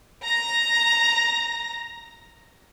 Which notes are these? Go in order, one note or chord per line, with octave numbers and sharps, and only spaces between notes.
A#5 A#6